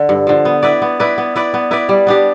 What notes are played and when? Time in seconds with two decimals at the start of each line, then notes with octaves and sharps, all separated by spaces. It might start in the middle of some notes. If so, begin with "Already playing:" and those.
Already playing: D3
0.09 G2
0.27 D3 F3
0.45 B3
0.62 E4 B4 D5
0.82 B3
1.00 E4 B4 D5
1.18 B3
1.36 E4 B4 D5
1.54 B3
1.71 E4 B4 D5
1.89 G3
2.07 B3 D4 G4